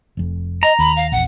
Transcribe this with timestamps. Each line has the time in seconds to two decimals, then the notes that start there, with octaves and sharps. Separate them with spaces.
0.17 F1 F2
0.63 D#5 A#5
0.79 D#2 B5
0.96 F5
1.12 A#1 E2 F#5